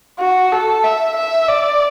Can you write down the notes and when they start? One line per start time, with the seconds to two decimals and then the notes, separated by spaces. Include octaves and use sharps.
0.20 F#4
0.52 A4
0.84 E5
1.17 E5
1.49 D5